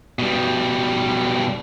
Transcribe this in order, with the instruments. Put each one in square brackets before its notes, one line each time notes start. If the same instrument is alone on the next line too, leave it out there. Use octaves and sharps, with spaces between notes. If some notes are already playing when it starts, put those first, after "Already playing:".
[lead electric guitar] B2 G3